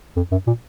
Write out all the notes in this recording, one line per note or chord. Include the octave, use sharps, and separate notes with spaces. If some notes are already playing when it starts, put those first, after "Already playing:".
F2
F#2
A#2